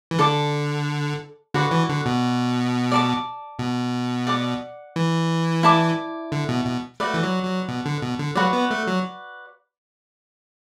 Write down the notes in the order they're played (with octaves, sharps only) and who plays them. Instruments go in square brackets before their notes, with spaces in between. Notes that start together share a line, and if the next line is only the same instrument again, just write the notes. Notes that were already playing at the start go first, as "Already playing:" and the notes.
[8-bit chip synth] E3
[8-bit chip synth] D3 [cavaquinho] A4 D5 A5 D6
[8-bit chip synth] D3 [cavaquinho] F#4 B4 D5
[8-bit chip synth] E3
D3
B2
[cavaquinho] D5 A5 D6
[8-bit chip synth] B2
[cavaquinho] D5 F#5 D6
[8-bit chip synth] E3
[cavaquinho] E4 D5 A5 D6
[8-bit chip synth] D3
B2
B2
[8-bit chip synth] A3 [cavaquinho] F#4 B4 D5
[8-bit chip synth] E3
F#3
F#3
B2
D3
B2
D3
[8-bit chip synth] F#3 [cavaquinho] F#4 B4 D5
[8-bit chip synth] B3
A3
F#3